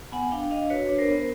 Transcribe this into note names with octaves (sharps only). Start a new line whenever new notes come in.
B3 F#5 G#5
D4 F5 G5
D4 D#5 F5
F#4 B4 C#5
D4 C#5
A#4 C5
B3